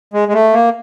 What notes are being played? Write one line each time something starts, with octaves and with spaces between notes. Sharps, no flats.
G#3
G#3
A3
A#3